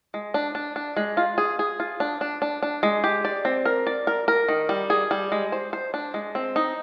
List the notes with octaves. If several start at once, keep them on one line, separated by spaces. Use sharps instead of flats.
G#3
D4
D4
D4
G#3
F4
G#4
G#4
F4
D4
D4
D4
D4
G#3
G4
D5
C4
A#4
D5
A#4
A#4
D#3
G3
G#4
G3
G#3
C5
C5
D4
G#3
C4
D#4